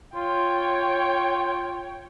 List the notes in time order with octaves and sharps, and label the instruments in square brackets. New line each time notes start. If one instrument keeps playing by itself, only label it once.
[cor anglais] F4 [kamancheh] C#5 G5